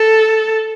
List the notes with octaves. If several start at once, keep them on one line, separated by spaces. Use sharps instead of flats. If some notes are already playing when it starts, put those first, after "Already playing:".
Already playing: A4